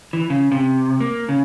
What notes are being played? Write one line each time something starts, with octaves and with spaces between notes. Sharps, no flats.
E3
C#3
C3
A#3
C#3